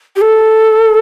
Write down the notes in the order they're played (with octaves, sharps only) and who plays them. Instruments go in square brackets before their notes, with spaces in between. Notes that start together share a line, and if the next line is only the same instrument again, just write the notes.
[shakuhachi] G4
A4